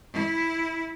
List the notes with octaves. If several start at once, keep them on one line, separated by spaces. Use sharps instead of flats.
E4